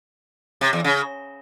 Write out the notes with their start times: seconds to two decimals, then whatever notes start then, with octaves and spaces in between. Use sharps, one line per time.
0.61 C3
0.73 E2
0.84 C#3